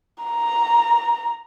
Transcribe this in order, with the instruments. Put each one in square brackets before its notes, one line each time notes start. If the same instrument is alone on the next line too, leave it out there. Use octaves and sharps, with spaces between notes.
[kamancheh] A#5